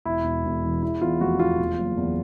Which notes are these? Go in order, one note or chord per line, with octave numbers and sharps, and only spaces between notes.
E1 E4
E1
E1
E3
E2 E4
E2 F4
F1 F#4
E2 F4
E2
F#1
E2